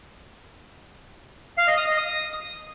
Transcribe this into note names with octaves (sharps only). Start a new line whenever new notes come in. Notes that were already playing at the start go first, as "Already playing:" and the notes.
F5
D#5
D#6
D#5
D#6